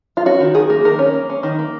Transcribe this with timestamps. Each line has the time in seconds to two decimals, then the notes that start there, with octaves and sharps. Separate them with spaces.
0.17 F4
0.26 C#4 F#4
0.40 D#3
0.55 D#3 G#4
0.70 A#3
0.85 D#3 A#4
0.99 C#4
1.14 A#3
1.30 C#4
1.43 D#3
1.59 A#3